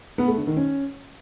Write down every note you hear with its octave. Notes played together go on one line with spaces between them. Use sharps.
B3
A3
D3
D#3
C#4